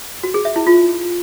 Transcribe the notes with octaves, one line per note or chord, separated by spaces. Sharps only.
F#4
G#4
E5
E4
F4